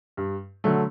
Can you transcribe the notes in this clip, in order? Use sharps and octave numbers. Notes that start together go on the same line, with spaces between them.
G2
D3 F#3 A3